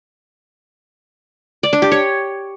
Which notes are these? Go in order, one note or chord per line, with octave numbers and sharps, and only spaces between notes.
D5
D4
G4
C#5